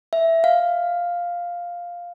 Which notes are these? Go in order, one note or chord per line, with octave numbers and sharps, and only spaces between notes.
E5
F5